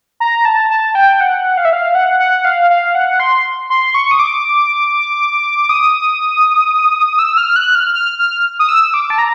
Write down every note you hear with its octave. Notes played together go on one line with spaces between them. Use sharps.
A#5
A5
A5
G5
F#5
F5
E5
F5
F#5
F#5
F5
F5
F#5
C6
C6
C#6
D#6
D6
D#6
E6
F6
F#6
F6
F6
F6
D#6
E6
D6
A5
A#5